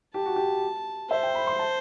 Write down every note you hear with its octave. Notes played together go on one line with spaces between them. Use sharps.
G4 A5
F#4
G4
C5 E5
G5
B5
C6
A5